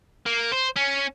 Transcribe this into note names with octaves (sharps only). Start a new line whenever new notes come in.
A#3
C5
C#4